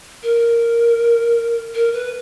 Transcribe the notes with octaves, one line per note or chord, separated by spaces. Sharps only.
A#4
A#4
B4